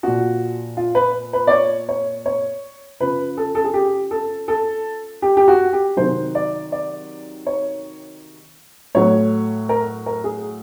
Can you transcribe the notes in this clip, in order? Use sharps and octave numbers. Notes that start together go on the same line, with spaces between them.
A#2 F3 F#4
F4
B4
B4
D5
C#5
C#5
C#5
C#3 F3 B4
A4
A4
G#4
G4
A4
A4
G4
G4
F#4
G4
C3 D#3 F#3 C5
D5
D5
C#5
A2 F#3 C#5
A#4
A#4
G#4